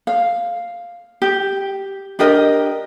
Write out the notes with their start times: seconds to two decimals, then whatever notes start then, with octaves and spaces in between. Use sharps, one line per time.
0.07 F5
1.22 G4
2.19 D4 G4 A#4 D#5